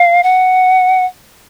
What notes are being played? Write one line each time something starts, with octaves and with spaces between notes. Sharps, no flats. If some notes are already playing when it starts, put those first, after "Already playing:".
Already playing: F5
F#5